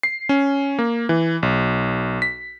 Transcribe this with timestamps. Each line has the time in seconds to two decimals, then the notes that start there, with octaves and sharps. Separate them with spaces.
0.03 C7
0.29 C#4
0.79 A#3
1.09 E3
1.43 B1
2.22 B6